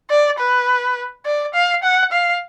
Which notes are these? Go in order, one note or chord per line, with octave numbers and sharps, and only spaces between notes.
D5
B4
D5
F5
F#5
F5